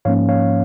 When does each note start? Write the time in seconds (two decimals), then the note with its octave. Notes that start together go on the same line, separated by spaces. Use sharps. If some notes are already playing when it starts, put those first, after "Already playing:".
0.05 G#2 F3 A#3 C#4 C#5 F5
0.29 C#5 F5